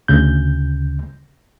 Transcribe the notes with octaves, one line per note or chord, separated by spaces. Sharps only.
D2 C#3 G6